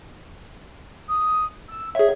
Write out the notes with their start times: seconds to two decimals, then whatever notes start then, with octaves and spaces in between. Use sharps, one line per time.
1.08 D#6
1.69 E6
1.95 G#4 C#5 E5